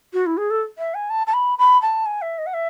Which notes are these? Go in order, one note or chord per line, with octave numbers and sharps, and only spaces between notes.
F#4
E4
G#4
A4
E5
G#5
A5
A5
B5
B5
A5
G#5
E5
D#5
F#5
E5